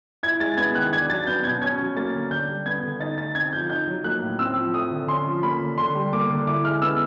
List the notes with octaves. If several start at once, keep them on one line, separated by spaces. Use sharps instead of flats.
E4 G#6
G#3 A6
B3 G#6
D#3 F#6
D4 G#6
F#3 A6
B3 G6
B2 G#6
C#4 G#6
F#3
A#3 A6
D3
D4 G6
G3
B3 G#6
D3
D#4 A6
A3 A6
C4 G#6
F3 G6
D#4 G6
F#3
A#3 F#6
A2
C4 E6
F3
A3 D#6
D3
C#4 C6
F3
A#3 B5
D3
D3 C6
G3
A#3 D6
D3
E4 D6
G#3 F6
B3 E6